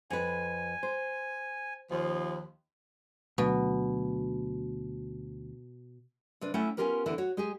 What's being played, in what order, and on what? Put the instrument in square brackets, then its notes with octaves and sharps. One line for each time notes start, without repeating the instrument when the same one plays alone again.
[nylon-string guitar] F2 B4 [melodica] G#5
[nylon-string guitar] C5
[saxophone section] D#2 F3
[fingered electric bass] D2 F#3 [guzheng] B2
[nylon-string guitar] C3 D4 B4
A3 C#4 E4 F#5 G5
B3 C#4 F4 G4 A#4 B4
D3 E3 B3 E4
F#4 C#5
G#3 G4 G#4